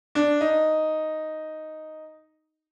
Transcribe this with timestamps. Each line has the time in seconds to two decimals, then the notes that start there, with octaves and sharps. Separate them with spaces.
0.15 D4
0.41 D#4